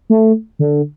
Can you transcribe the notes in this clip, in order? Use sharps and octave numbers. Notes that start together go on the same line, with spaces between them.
A3
D3